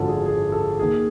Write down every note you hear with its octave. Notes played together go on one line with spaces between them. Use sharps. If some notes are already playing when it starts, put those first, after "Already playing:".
Already playing: G#1 F#2 D3 F3 A4
G#4
G#4
A4
D#2 D#3 G#4